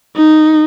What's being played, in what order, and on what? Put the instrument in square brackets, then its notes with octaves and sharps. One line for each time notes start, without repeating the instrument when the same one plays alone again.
[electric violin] D#4